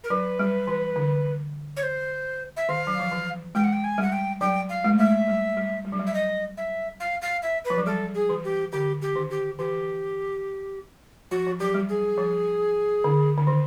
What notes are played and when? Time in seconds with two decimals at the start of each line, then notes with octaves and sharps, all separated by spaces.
0.04 A#4
0.10 F#3 B4
0.39 G3
0.67 E3
0.96 D3
1.77 C#5
1.83 C5
2.57 E5
2.69 D#3 F5
2.87 F#3
3.00 F3
3.12 E3
3.55 G#3 G5
3.64 F#5
3.73 G5
3.84 G#5
3.98 G3 F#5
4.12 G5
4.41 F#3 G5
4.70 F5
4.84 G#3
4.92 A3
4.98 G#3 E5
5.28 G3
5.57 G3
5.85 G3
5.92 F#3
5.99 G3
6.07 E5
6.14 D#5
6.57 E5
7.00 F5
7.22 F5
7.43 E5
7.65 B4
7.70 F3
7.78 F#3
7.86 G3 A4
8.15 G#4
8.29 E3
8.44 G4
8.72 D3 G4
9.02 G4
9.16 D#3
9.30 G4
9.59 E3 G4
11.31 F3 F#4
11.47 F3
11.60 F#3 G4
11.74 G3
11.89 G#4
12.18 F3
13.04 D3
13.38 D3
13.47 D#3